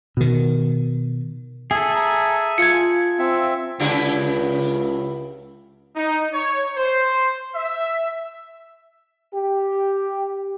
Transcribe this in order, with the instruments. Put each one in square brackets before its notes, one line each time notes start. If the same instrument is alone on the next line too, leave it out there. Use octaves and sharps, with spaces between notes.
[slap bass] B2 D#3
[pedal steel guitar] G#4 A4 [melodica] E5 G#5
[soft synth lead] A#5
[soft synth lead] F4 [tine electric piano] G#6 C#7
[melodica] C4 E5
[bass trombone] C#2 [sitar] C#3 E4 G4
[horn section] D#4
C#5
C5
E5
[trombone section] G4